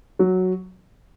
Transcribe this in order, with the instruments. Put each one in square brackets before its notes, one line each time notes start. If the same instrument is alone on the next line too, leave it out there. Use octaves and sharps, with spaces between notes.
[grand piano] F#3